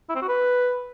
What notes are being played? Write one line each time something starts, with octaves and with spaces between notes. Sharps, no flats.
E4
C4
F#4
B4